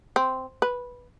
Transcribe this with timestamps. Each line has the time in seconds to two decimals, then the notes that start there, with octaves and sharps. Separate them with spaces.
0.16 C4
0.62 B4